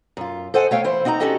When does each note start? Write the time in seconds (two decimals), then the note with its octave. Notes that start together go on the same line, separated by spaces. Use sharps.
0.17 F#2 F4
0.54 A4 C5 D#5 F#5 G#5
0.71 A3 C#5 F5 G5
0.84 E3 E4 C5
1.05 C4 D#4 F#4 F#5 A#5
1.20 C#4 D4 F#4 G4 A4 D#5